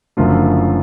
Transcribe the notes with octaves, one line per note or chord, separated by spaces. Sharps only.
F#1 F#2 D3 F3 A3 F4